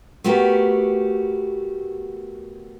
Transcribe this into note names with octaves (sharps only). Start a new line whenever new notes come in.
A3 B3 F#4 G4 A#4